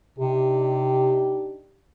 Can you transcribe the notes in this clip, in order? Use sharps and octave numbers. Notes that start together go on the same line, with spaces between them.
C3 D4 D#4 G4